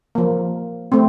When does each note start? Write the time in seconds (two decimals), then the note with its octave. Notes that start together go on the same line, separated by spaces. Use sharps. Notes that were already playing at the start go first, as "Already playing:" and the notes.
0.15 F3 A#3
0.92 A3 C4